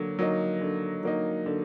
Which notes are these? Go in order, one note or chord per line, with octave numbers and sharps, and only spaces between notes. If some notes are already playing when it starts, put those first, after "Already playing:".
Already playing: D3 F#3 A#3
F#3 A#3 D#4
D3
F#3 A#3 D#4
D3